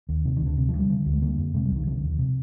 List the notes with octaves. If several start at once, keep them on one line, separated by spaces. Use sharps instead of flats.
D#2
C3 D#3
D#3
D2 D3
C3
F3
D2
G3
D3
D2
G#3
D3 A#3
F2
C3 G#3
G3
C2
D#3
D3 F3
D#2
C3